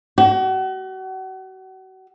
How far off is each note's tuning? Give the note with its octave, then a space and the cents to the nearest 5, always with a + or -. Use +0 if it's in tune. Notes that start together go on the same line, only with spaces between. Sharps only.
F#4 +35